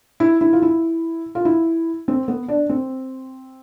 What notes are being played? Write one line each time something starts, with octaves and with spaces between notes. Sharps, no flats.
E4
E4
F4
E4
F4
E4
C4
B3
D4
C4